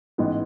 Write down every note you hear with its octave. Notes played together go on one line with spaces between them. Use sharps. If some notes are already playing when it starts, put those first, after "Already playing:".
A1 G#2 E3 B3